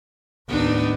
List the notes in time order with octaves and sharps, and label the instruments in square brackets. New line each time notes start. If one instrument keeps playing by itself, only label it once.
[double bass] D#2 A2 [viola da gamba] B3 D4 D#4